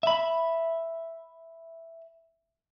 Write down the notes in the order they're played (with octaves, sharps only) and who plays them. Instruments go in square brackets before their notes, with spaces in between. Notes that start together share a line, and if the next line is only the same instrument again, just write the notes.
[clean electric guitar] E5 B5